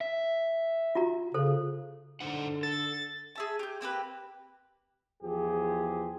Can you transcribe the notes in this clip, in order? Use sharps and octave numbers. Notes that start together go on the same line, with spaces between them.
E5
F4 F#4 A#5
C#3 A4 C5
D3 D#4 C5 F#5
A4 A6
G#4 E5 A5
G4 G6
A#3 C4 G4 B4
E2 F3 G4 G#4